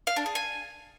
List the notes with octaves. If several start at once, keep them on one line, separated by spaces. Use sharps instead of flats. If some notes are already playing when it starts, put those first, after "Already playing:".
F5
D4
G#4
G#5